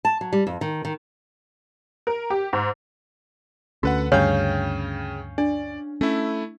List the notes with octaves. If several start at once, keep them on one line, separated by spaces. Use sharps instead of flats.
A5
F#3
G3
F2
D#3
D#3
A#4
G4
G#2
D2 C#4 F#4 A4 B4 F#5
D2 G2 C#3 C#4 C#5 F5 G5 G6
D4 D5
A3 C#4 E4